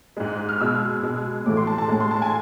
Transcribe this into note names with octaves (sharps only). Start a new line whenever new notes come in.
G#2 G#3
F6
B2 G#3 E6
B2 G#3
A2 E3 A3 D6
C6
A5
A5
A2 G#3 A5
C6
A5
G#5